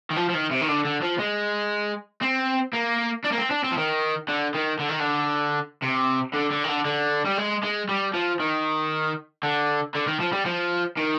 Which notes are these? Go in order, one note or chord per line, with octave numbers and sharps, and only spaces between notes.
D#3
F3
F3
D#3
C3
D#3
D3
D3
F3
G#3
C4
A#3
D4
A#3
C4
D4
C4
F3
D#3
D3
D#3
D3
D#3
D3
C3
D3
D3
D#3
D3
D3
G3
G#3
G#3
G3
F3
D#3
D3
D3
D#3
F3
G3
F3
D#3